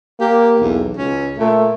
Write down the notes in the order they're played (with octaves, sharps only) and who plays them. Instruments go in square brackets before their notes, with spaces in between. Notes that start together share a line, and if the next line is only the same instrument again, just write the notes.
[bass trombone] A#3 [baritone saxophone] G4
[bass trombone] B1 [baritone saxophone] E2
[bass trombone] C#2 [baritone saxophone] C#4
[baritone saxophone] A#2 [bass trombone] A3